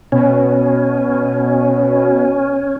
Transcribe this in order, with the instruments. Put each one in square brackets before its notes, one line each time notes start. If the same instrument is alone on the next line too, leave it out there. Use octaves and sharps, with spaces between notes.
[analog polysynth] B2 [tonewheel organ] C#4